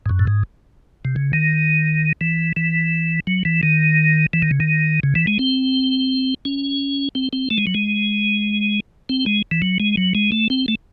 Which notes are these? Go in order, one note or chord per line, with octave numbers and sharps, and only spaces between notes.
G#2
F#2
A2
G#2
C3
C#3
D#3
E3
E3
F#3
E3
D#3
E3
D#3
C#3
D#3
C#3
E3
G#3
C4
C#4
C4
C4
A3
G#3
F#3
G#3
C4
G#3
E3
F#3
G#3
F#3
G#3
A3
C4
A3